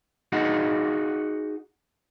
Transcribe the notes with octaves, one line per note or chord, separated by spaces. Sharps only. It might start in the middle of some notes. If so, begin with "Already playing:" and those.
D#4 F#4 G#4 D#5 F#5